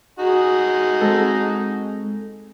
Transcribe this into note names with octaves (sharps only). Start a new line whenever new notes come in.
D#4 F#4 G#4
G#3 C4 A4